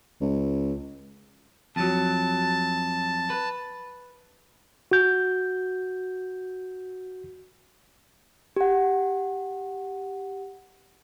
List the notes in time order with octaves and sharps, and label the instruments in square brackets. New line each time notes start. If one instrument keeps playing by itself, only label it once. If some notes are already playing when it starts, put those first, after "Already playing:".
[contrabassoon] C#2
[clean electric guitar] F2 F#3 [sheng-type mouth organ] A5
[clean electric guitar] B4
[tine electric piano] F#4 G6
[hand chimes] G4 F#5